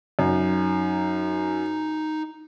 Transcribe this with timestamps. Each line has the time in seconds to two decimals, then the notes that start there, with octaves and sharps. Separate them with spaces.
0.19 F#2 D#4